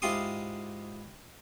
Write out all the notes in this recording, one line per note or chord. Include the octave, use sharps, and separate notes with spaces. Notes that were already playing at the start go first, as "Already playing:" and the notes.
G#2 E4 F4 G4 C6 D#6